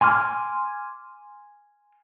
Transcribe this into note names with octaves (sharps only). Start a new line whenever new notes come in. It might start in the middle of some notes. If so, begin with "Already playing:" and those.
G#5 C6 D6 F6